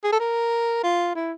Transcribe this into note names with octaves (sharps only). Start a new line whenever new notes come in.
G#4
A4
A#4
F4
E4